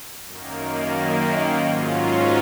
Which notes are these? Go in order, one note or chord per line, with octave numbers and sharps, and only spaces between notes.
F#2 D#3 A#3
G#2 F#3 C#4 F4